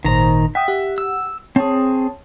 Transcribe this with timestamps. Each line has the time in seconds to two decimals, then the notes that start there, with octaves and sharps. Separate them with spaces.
0.05 G#1 A#2 D#3 C5 A#5
0.55 E5 F#5 G5 D#6
0.68 G4 F#5
0.98 E6
1.56 C4 G#4 C#5 A5